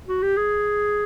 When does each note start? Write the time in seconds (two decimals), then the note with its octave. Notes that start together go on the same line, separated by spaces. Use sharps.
0.08 F#4
0.23 G4
0.37 G#4